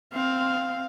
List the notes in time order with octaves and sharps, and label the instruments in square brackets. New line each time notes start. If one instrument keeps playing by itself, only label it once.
[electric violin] C4 [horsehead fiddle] F5